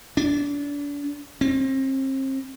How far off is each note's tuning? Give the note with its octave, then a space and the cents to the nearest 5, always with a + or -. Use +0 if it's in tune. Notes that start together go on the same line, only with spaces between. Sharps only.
D4 -35
C4 +35